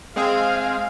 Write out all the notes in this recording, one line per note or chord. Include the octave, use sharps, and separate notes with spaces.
G#3 C4 G#4 F5